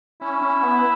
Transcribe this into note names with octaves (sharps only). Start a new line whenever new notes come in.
C#4 E4
C#4
B3